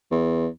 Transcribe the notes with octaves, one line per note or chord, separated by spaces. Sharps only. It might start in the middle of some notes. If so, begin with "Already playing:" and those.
E2